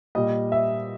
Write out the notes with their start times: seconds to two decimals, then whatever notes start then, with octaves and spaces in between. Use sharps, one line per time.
0.15 A#2 G3 D#5
0.52 E5